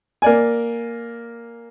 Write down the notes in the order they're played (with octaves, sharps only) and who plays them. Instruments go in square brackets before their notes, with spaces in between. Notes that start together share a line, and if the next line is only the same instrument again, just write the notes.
[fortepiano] A#3 D5 G#5